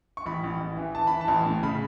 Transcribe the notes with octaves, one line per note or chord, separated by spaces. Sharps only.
C#6
A1 B5
A1
A1
E3
E3 A5
E3 B5
A5
A1
A2
C#3 B5